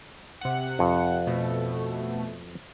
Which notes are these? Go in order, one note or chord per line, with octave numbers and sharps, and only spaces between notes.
C3 F#5
F2
B2 A3